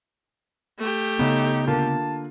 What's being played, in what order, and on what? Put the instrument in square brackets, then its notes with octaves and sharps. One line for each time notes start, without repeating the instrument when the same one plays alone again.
[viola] A3 G4
[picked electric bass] C#3 B3 [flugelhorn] D#4
[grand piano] D3 A#3 F4 [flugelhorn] A5